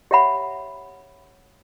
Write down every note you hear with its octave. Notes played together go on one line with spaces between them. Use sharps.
G4 C#5 E5 F#5 B5